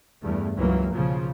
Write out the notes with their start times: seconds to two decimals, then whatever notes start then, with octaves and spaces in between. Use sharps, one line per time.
0.22 E2 G2 A3
0.57 C#2 E3 F#3 A#3
0.94 B1 C#3 F3